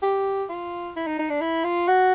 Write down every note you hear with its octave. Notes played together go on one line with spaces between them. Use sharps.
G4
F4
E4
D#4
D#4
D4
E4
F4
F#4